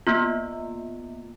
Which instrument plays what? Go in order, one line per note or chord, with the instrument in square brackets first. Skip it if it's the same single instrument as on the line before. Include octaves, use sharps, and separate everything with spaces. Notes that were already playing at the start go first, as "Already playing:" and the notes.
[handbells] A#3 B3 F4